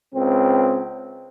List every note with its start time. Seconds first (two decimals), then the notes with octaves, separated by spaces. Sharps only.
0.14 C#2 C4